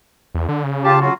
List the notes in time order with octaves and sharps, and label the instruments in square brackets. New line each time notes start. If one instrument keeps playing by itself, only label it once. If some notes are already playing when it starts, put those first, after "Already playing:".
[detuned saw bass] E2
D3
C#3
[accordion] F4 G4 A5
F#3 F4 F#4